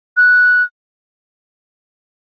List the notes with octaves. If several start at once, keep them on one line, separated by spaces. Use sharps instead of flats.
F#6